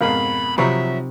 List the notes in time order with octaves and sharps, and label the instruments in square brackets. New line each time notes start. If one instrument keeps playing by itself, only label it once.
[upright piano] F2 G#2 B2 [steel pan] A#4 F5 [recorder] B5
[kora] C3 D#4 [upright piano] F3 F#3 A#5 [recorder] E5 [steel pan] B5 C#6